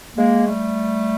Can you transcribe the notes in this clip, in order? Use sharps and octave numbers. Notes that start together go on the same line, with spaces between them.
G#3 A#3
G3 A3